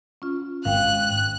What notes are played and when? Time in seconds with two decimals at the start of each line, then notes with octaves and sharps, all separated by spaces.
0.22 C#4 F4
0.65 G#1 F5 G5 F#6